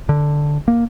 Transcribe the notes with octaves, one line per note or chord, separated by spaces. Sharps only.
D3
A#3